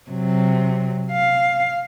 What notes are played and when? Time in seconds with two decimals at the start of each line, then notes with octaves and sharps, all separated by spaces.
0.10 C3 F#3
1.11 F5